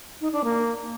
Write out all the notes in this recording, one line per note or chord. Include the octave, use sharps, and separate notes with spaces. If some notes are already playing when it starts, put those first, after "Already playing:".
D#4
D4
A#3